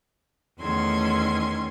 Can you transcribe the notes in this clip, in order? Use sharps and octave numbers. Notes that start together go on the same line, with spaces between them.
E2 D#3 A3 C#4 C6 G#6